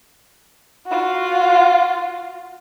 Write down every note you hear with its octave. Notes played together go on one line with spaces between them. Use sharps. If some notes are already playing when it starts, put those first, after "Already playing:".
F4 F#4